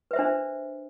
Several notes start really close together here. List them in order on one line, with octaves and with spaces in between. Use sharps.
B4 E5 C5 D4